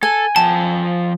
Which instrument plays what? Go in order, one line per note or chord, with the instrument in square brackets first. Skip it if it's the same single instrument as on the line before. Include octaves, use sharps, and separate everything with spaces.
[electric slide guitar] A4 [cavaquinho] G#5
[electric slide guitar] F3 G5 [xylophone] A5